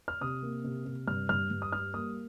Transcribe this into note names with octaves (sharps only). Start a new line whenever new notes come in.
F6
C3 D#6
A#3
C3
C3
G2 F6
G2 F6
G2
D#6
G3 F6
A#3 D#6